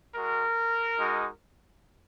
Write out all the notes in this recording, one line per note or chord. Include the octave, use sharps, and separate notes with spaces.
G#3 F#4 A#4
G#3 D#4 F#4